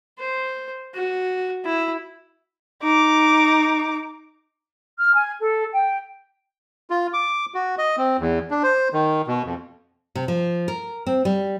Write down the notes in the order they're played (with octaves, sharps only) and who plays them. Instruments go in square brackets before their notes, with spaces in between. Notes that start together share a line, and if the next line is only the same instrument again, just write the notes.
[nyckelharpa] C5
F#4
E4
[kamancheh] D#4 D6
[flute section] F6
G#5
A4
G5
[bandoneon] F4
D6
F#4
D#5
C4
E2
D4
C5
D#3
B2
F2
[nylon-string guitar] C3
F3
A#4
C4
G3